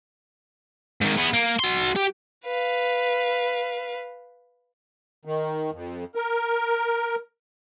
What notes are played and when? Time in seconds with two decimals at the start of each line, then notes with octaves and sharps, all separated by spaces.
1.01 G#2 D#3
1.18 B3 G#4
1.33 A#3
1.59 F#4 C6
1.96 G4
2.45 B4 F5
5.25 D#3
5.72 F2
6.15 A#4